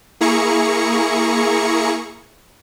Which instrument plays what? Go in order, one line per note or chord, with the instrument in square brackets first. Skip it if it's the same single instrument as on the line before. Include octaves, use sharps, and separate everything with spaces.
[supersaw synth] A#3 E4 G#4 A#5 C#6 C#7